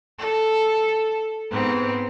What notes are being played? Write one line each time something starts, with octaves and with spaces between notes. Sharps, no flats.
A4
G#2 B3 C4